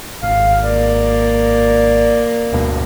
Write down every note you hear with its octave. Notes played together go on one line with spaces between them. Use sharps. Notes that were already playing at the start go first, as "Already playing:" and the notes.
G#1 F5
A#3 D5
D2 G2 B2